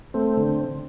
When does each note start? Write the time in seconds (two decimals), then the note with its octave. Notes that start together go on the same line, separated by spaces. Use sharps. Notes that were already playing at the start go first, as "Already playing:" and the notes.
0.14 A3 C4
0.37 D3